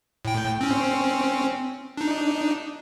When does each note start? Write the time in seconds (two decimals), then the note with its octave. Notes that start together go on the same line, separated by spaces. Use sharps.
0.25 A2 G5
0.61 C4 C#4
1.97 D4 D#4